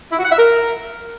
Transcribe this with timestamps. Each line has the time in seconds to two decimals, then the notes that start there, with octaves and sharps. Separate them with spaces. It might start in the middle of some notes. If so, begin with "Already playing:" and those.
0.12 E4
0.19 F#4
0.25 F#5
0.32 E5
0.38 A#4